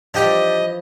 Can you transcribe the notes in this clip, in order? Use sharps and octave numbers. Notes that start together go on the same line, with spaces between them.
E3 F3 D4 G4 D#5 G5